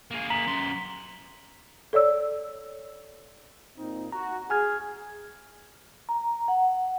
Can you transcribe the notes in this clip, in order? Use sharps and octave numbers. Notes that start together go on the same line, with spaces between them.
A#3 G#4
A#5 B6 F#7
F#2 C6
A4 C#5 D5 E6
A#2 C4 D#4
F#4 A#5
G#4 G#5 F6 G#6
A#5
F#5